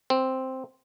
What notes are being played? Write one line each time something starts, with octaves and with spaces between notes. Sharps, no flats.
C4